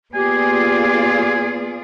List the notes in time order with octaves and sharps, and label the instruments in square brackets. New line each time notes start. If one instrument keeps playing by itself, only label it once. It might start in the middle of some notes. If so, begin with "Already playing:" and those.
[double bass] A#3 B3 [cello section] F4 G#4 D5 [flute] G4 [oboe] G#5